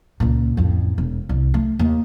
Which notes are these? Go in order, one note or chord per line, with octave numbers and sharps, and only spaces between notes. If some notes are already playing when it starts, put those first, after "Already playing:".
C#2 A#2
A1 F2
E1
C2
A3
D#2